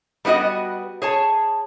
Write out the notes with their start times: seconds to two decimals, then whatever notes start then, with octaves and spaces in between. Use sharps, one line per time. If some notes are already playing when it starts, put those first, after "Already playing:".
0.25 G3 B3 D#4 F#4 D#5
1.02 G#4 C#5 A5